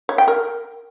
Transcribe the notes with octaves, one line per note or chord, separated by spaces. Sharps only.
C#5
G5
A#4